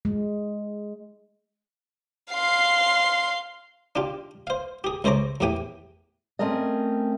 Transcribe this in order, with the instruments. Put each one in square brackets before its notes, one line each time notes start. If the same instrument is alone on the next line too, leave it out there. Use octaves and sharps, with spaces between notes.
[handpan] G#3
[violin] F5 C6
[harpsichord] D4 F4 G4
C5 F5
G4 G#4
C#2 A4 C5 C#5 A#5 D6
E2 A2 E3 G4 G5 G#5
[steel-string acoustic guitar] A3 C4 C#4 A#4 D#5